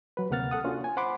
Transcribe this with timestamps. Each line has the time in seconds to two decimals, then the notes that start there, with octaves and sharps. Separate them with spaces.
0.17 F#3 B4
0.30 D2 C3 A#3 F#5 F6 A6
0.51 A4 F#5 D#6
0.64 A#3 C#4 D4 F4 F#4
0.84 G#5
0.97 C5 F#5 B5 C6 D6